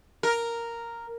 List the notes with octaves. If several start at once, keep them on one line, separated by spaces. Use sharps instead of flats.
A#4